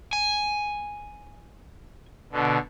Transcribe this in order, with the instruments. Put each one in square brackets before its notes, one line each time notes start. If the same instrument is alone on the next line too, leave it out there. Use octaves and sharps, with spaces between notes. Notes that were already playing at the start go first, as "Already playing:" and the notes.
[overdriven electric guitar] G#5
[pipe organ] B2 D3